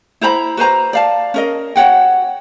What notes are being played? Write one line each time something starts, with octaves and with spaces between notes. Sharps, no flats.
E4 C5 A#5 B5
F#4 B4 C5 A#5
D5 F5 A5
C#4 A#4 D#5
F#4 C#5 F#5 G5